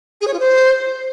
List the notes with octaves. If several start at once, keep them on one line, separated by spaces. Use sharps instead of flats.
G#4
C#5
F4
C5